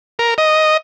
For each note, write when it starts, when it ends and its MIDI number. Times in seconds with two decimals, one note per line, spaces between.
0.19 0.34 70
0.38 0.77 75